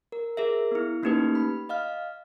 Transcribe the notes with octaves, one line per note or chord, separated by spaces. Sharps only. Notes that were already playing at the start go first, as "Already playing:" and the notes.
A#4
G#4 A#4 E5
B3 E4
A3 A#3 C#4 D#4 G4 B4
B5
D#5 F5 F6